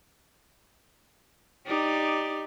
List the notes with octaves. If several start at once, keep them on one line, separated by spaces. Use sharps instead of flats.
D#4 G4 D5